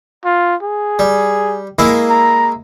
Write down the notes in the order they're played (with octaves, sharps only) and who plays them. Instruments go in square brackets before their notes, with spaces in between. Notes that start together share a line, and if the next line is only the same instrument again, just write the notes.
[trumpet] F4
G#4
[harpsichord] G3
G#3 A#3 E4
[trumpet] A#5